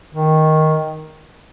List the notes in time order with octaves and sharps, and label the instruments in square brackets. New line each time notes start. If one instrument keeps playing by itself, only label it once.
[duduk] D#3